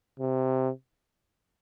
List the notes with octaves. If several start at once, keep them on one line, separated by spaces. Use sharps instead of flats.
C3